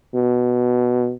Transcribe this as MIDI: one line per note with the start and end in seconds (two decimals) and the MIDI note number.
0.14 1.13 47